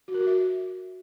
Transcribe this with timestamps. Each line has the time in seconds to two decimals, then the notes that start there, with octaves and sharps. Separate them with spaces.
0.08 F#4
0.14 A#4
0.21 F#4
0.27 E5